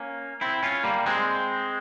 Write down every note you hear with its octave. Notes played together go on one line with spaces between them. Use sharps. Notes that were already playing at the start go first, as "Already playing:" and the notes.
Already playing: A#3 C#4
C4 E4
C#4 F4
G3 A#3
G#3 C4